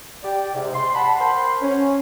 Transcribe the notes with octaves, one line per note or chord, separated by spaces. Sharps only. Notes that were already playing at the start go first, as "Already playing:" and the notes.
G4 D5
G#2 C3
C6
F#5 A5 B5
A#4 C5 F#5 G5 B5 C6
C#4